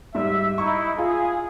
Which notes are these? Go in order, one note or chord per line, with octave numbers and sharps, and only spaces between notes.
G#2 G3 E5
D#4 E4 C#6
F4 G#4